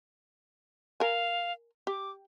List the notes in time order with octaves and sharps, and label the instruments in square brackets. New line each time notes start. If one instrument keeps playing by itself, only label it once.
[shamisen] A#4 G#5 [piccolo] F5
[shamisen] G4 [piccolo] D6